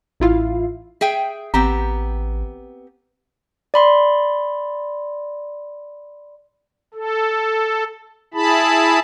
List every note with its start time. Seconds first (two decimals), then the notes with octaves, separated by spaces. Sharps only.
0.20 A1 E4 F4 F5
1.01 G#4 E5 G5
1.54 A1 B3 C4 G4 A#5
3.74 D5 B5 C6
6.94 A4
8.34 E4 G#4 A5 B5